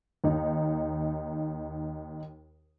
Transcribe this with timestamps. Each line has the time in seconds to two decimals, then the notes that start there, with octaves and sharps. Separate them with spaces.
0.24 D#2 D#4